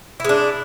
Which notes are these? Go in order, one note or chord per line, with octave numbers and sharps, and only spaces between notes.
G#3 D4 E4